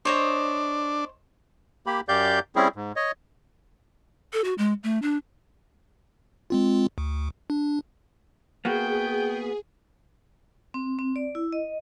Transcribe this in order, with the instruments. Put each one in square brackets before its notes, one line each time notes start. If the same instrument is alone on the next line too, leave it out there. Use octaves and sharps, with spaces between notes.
[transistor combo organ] D4 [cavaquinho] C5 C#5 D#5
[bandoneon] A#3 G4 B5
F#2 G4 D5 F5 G6
G3 C4 C#4 E4 G#4
G#2
C#5 D#5
[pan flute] A4
F#4
G#3
A3
D4
[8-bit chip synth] G#3 C4 F4
D2
D4
[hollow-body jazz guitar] A#3 B3 F#4 [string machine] G#4 [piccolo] G5
[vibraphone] C4
C4
D5
E4
D#5